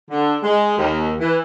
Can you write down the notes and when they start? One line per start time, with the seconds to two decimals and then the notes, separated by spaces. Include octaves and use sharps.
0.10 D3
0.43 G#3
0.77 D#2
1.19 E3